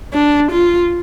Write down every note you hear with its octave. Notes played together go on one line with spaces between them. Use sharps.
D4
F4